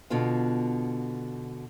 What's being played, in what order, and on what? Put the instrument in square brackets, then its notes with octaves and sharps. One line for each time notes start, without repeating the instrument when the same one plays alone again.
[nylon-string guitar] B2 D3 B3 F4 F5